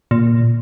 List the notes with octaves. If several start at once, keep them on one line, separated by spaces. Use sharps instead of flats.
A#2